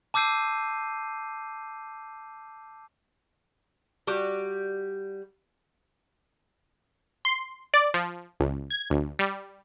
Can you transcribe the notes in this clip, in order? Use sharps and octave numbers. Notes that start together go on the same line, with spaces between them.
A5 D6 E6 G6 C7 D#7
G3 F#4 G4
C6
D5
F3
C#2
G#6
D2
G3